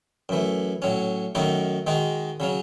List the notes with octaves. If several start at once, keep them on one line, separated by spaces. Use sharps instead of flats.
F#2 E3 A3
A2 F#3 C#4
F#2 D#3 A3 D#4 F#4
D#3 G#3 D#4 F#4
C#3 F#3 C#4